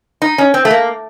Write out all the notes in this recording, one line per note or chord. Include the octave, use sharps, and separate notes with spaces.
D#4
C#4
C4
A3
A#3